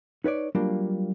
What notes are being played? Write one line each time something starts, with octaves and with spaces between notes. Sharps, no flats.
D#4 B4 C#5 D5
F#3 G3 A#3 D4 F4